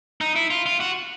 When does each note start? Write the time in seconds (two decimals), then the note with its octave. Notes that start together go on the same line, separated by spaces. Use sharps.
0.21 D#4
0.36 E4
0.51 F4
0.66 F4
0.80 F#4